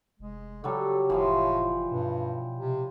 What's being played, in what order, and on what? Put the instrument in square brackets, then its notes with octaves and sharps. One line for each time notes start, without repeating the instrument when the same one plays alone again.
[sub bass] F1 [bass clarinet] G#3
[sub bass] C#3 [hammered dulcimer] F#3 G3 [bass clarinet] A4
[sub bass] F1 [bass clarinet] A2 [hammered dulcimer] E3 F3 C5
[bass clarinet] G2 [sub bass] B2
[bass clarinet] C3